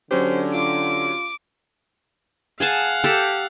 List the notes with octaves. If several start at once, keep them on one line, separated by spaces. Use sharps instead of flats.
D3 F#3 C#4 G4 C5
F4 D6
G#4 F5 F#5 G#5 A5
G4 A4